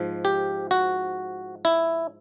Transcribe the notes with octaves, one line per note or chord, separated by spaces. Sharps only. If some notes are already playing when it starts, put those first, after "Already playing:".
Already playing: G#2 F3
G4
F#4
E4